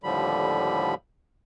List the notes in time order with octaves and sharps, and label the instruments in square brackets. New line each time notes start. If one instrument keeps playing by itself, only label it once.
[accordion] D#2 A2 D3 F3 G3 B5